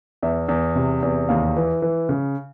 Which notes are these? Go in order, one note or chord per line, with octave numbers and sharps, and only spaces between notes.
E2 E5
E2
C3
E2
D#2 F5
E3
E3
C#3